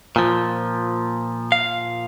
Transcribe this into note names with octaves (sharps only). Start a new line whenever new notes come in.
A#2 F3
F5